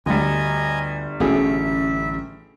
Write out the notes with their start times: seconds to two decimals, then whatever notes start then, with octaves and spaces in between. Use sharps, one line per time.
0.06 G1 D2 G3 D#5 G#5 A#5
1.20 A1 B2 A3 C#4 G#4 E5